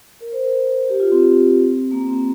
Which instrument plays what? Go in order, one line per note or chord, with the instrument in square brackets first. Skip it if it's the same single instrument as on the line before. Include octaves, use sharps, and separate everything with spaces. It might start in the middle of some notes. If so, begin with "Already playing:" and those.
[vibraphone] A#4
C5
A#4
G4
F4
C4
A#3
C4